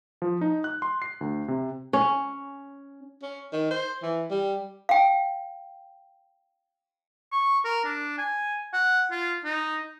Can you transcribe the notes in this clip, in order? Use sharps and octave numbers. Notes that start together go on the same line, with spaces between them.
F3
D#4
F#6
C6
C7
D2
C3
C#4
C#4
D#3
C5
E3
G3
F5 G5
C#6
A#4
D4
G#5
F#5
F4
D#4